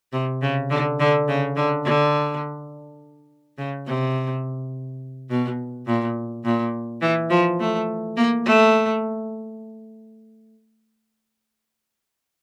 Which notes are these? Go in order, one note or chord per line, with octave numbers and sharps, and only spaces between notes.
C3
C#3
D3
D3
C#3
D3
D3
C#3
C3
B2
A#2
A#2
E3
F3
A3
A#3
A3